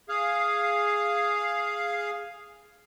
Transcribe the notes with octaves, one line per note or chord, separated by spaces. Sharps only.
G#4 F5